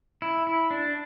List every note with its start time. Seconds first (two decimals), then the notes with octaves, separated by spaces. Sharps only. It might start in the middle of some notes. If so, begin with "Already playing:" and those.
0.22 E4
0.47 E4
0.71 D4